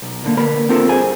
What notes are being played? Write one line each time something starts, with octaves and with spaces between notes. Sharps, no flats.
B1
A#2 D3 A#3
D3 A#3 A#4 B4 B5
C4 D4 F4 A4 A#4
G2 G#4 C5 G#5